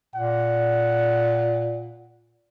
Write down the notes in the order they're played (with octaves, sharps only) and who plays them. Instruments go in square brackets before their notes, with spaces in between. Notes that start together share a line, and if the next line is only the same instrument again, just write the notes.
[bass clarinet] A#2 [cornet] F#5